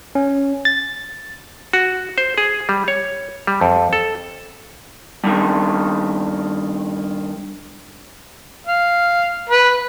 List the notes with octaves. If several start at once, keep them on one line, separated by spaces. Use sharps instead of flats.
C#4
A6
F#4
C5
G#4
G3
C#5
G3
F2
A4
G2 D#3
F5
B4